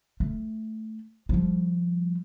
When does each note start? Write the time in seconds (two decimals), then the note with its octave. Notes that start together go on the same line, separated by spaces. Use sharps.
0.20 A3
1.29 F3 G3